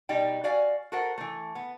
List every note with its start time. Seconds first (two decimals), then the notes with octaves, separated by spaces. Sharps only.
0.09 B2 G3 D#4 D5 G5
0.44 F#4 D5 F5 G#5
0.92 F#4 A4 A#4 C5 F#5
1.18 E3 A3
1.55 B3